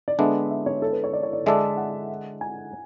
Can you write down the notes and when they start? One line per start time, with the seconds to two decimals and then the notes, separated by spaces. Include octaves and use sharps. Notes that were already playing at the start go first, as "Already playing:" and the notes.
0.08 D5
0.19 D3 G#3 B3 D4 E5
0.51 E5
0.66 C#5
0.82 A4
0.93 B4
1.04 C#5
1.13 D5
1.23 C#5
1.33 D5
1.46 D3 G#3 D4 A4 D5 E5
1.77 F#5
2.41 G#5